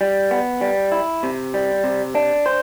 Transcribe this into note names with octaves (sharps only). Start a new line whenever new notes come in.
G3
B3
G3
E4
C3
G3
C3
D4
C5